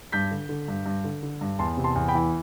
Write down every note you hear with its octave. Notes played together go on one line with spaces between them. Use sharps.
G2 G6 B6
D3
D3
G2
G2
D3
D3
G2
E2 A5 C6
C3
A5 C6
E2
G5 B5
E3